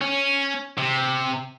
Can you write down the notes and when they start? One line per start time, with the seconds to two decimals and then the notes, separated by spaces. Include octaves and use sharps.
0.01 C#4
0.78 C3